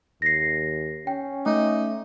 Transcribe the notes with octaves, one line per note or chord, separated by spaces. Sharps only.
D#2 A#6 C7
C#4 G5
A3 D#4